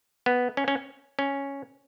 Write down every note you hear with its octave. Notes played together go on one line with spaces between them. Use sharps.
B3
C#4
C#4
C#4